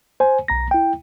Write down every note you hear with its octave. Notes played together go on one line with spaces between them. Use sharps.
C5 G#5
B1 A#5 A#6
E4 G5